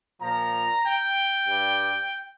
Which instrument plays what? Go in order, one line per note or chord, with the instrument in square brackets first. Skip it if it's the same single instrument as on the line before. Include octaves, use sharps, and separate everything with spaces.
[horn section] A#2 F3 A#5
G5
G2 G3